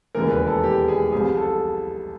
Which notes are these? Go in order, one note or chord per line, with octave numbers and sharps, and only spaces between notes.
E1 D#2 C#3 E3 A#4
B4
A4
G4
G#4
C2 C3 F3 G#4
A4